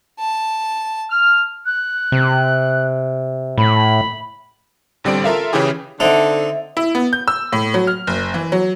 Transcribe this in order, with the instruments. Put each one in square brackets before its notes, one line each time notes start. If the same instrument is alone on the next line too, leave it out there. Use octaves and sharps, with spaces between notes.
[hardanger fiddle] A5
[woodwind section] F6
[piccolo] F#6
[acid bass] C3
[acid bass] A2 [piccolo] B5
[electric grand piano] A1 D3 G3 C4 D5 D7
F4 A4 A#4 E5 F5
C#3 E3 C#4 E4 G4 G#4
[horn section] D3 [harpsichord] C4 D#4 A4 [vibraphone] E5
[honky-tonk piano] E4
B3
G6
E6
A2
F#3
F6
F#1
E3
F#3